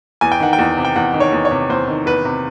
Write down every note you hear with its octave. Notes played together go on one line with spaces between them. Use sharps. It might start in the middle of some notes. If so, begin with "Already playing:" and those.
E2 G#5
G5
D#3 F#5
G5
E2
C3
G5
E2 F#5
D#3
C#5
E2
C#5
C3
E2 C5
D#3
E2 B4
C3